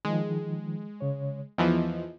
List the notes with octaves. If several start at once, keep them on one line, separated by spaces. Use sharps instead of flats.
D#3 F3 G#3
C#3 C#5
E2 E3 F3 D#5